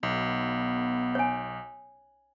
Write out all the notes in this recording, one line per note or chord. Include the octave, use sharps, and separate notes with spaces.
B1 B3
C#5 G#5